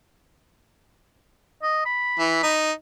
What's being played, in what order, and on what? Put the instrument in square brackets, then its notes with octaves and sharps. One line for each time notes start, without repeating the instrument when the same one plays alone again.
[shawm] D#5
B5
[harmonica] E3
D#4